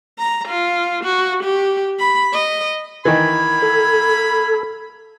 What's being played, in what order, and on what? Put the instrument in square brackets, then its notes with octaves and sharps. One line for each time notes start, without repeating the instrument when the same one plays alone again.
[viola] A#5
F4
F#4
G4
B5
D#5
[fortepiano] D#3 E3 [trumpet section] A#3 B5 [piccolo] G#6
[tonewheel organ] A4